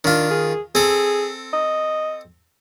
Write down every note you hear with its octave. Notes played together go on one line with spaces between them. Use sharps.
D#3 D4 F4
G#4
C4 G#4 A4
D#5